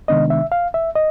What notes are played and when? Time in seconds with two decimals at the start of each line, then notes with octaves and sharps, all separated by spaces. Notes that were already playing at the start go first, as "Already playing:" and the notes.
0.08 C3 D#3 G#3 B3 D4 D#5
0.30 E5
0.52 F5
0.74 E5
0.95 D#5